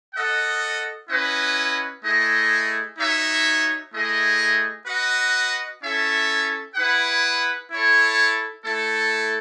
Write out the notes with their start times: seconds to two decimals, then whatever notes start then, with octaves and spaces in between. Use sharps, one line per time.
0.14 F#4 A4 D#5 F#5
1.09 C#4 E4 B4 D#5 F#5
2.03 A3 E4 G#4 D#5
2.98 D#4 F#4 C#5 E5
3.92 A3 E4 G#4 D#5
4.86 F#4 B4 D#5 F#5
5.82 C#4 E4 A4 C#5 E5
6.75 E4 G#4 B4 F#5
7.69 E4 A4 C#5
8.64 A3 E4 A4